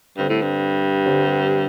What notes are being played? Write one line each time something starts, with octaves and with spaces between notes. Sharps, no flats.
G2 D3 G3 C4 A4 C5
A2
G2
D3 G3 C4 A4 C5